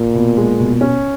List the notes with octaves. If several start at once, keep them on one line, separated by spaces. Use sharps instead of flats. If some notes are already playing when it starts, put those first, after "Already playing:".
Already playing: A#2
B2
G#3
B2
C#4